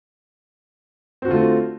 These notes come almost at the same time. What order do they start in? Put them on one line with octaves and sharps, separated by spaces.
C4 F#4 D3 F4 A3